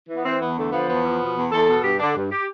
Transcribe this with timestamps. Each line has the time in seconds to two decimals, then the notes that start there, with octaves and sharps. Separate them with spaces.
0.09 E3
0.15 B3
0.25 E3 C4
0.41 E2 B3
0.57 D3 A3
0.72 F3 B3
0.88 E2 B3
1.04 F3
1.21 B2
1.36 E2
1.52 E2 A4
1.68 B2
1.83 G2 G4
2.00 D3 D4
2.15 G2
2.31 G4